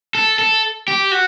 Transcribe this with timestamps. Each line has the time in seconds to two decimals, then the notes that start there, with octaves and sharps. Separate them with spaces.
0.15 A4
0.39 A4
0.88 G4
1.12 F#4